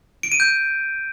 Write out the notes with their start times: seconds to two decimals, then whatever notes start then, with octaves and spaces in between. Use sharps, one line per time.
0.23 D7
0.32 D#7
0.40 G6